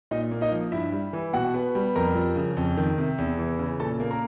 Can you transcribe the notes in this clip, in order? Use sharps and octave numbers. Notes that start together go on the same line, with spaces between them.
A#2 D#4 D#5
A#3
D#4 D#5
F3
G2 E4 E5
G3
E3
B2 F#4 F#5
B3
G3
F2 A#4 A#5
F3
C#3
F2
D#3
C3
E2
E3
C#3
A#2 A4 A5
A#3
A#4 A#5